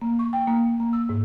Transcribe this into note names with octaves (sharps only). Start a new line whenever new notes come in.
A#3
C#6
G5
A#3
A#3
E6
G#2